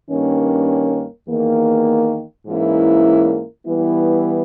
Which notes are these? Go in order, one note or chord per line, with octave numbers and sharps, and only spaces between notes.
G2 D#3 A#3 C#4
E2 D#3 A#3
G#2 E3 A#3 C#4 E4
E3 G3 B3 E4